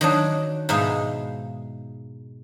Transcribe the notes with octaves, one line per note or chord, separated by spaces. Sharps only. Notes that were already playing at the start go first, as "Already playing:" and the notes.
D#3 F#3 D4
G#2 B2 D#4 E5 F5